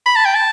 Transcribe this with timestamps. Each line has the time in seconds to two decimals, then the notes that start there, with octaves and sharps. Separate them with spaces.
0.06 B5
0.16 A5
0.25 G5
0.35 A5